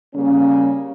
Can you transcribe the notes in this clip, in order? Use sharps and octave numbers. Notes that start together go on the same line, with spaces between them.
C#3 G3 A#3 C#4